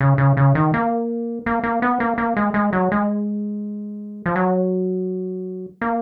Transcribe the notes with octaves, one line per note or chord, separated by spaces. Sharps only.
C#3
C#3
C#3
D#3
A#3
A#3
A#3
B3
A#3
A#3
G#3
G#3
F#3
G#3
F3
F#3
A#3